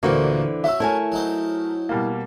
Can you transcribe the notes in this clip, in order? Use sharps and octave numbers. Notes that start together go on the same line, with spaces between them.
D2 A#2 D3 E3 A#3 F4 F#4 C5
F#3 C#4 E5 E6
A3 E4 A#4 C#5 G#5
F#3 D#4 C5
B2 G3 A#3